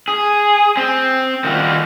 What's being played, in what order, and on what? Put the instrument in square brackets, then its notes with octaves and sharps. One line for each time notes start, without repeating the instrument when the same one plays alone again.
[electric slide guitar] G#4
C4
D#3 G3 F4 F#4